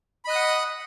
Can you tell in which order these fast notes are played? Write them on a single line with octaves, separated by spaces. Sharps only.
B5 D#5 F#6 D#6 F#5